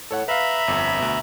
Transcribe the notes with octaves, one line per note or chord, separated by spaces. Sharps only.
A2 A4 C#5 F#5
B4 E5 F5 A#5 B5
G1 F2 E6
D2 B2